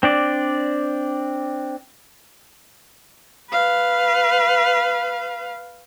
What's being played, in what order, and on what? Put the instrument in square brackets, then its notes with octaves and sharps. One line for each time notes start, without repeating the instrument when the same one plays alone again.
[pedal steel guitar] C4 D4 D5
[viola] B4 F5